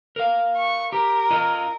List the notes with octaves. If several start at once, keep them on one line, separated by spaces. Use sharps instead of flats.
A#4 F5
C#6
G4 A#4
F4 D#5